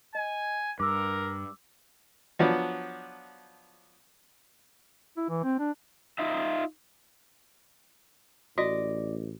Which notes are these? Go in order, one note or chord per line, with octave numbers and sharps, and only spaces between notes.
D#5 G#5
G2 A#4 D6 E6
F3 F#3 B3 D4
E4
E3
C4
D4
D#4 F4 E5
A1 F#4 D5 D#5